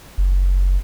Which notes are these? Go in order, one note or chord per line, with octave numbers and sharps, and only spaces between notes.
F#1